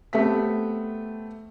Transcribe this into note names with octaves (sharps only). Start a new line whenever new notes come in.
A3 B3 C4 G4 B6